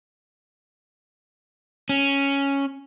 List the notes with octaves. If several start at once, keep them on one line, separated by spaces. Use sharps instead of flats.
C#4